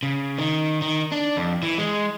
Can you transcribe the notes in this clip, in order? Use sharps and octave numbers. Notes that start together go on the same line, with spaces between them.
C#3
D#3
D#3
D4
F2
E3
G#3